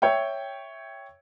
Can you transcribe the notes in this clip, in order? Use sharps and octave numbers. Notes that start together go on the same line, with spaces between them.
C#5 E5 G5